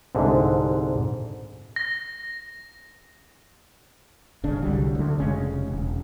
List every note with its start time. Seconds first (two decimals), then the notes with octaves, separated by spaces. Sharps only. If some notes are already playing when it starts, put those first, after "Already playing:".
0.15 C2 G#2 D3
1.76 A#6
4.43 G1 C#3 D4
4.62 C2 D3 F#3 G3
4.95 D2 D3
5.18 F1 C#3 G#3 C#4
5.68 E1